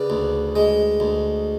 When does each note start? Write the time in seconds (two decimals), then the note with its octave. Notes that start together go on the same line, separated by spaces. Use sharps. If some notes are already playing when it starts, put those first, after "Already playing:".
Already playing: C#3 B4 D5
0.10 D2
0.56 G#3
1.00 D2